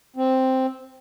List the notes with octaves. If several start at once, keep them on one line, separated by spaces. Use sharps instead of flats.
C4